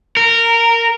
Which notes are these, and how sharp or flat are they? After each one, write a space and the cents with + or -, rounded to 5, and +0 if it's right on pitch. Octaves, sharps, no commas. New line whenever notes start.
A#4 -15